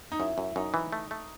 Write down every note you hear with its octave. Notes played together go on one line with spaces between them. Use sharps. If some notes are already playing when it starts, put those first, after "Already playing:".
D#4
F#2 E4
F#2
F#2 D#4
E3
A3
A3